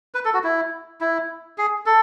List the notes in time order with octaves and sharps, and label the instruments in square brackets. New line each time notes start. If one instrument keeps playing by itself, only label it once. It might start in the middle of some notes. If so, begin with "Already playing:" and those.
[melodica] B4
A4
F#4
E4
E4
G#4
A4